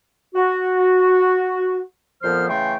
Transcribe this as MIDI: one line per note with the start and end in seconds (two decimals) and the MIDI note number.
0.35 1.81 66
2.23 2.47 41
2.23 2.47 46
2.23 2.47 53
2.23 2.47 59
2.23 2.47 72
2.23 2.47 89
2.49 2.75 49
2.49 2.75 52
2.49 2.75 57
2.49 2.75 79
2.49 2.75 84
2.49 2.75 85